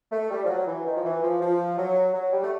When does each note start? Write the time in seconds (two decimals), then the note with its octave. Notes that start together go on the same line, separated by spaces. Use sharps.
0.12 A3
0.30 G3
0.44 F3
0.49 F#3
0.67 E3
0.86 D#3
0.96 F3
1.04 E3
1.23 F3
1.41 F3
1.77 F#3
2.14 F#3
2.32 G3
2.43 A3